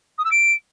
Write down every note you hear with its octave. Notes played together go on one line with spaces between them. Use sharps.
D#6
E6
D7